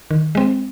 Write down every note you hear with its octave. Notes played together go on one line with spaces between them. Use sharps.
D#3
G#3 C4